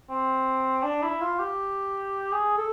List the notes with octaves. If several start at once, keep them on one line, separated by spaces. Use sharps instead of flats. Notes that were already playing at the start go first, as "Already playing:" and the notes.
C4
D4
E4
F4
G4
G#4
A4